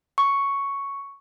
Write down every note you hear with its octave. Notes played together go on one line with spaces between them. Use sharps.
C#6